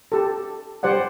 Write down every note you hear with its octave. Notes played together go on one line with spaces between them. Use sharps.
G4 A4
G3 G4 C5 D5 F#5